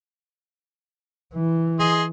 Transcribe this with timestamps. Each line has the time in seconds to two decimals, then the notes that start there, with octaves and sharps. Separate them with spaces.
1.34 E3
1.80 G#4 D#5 C6